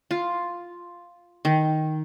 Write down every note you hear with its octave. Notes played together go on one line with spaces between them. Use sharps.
F4
D#3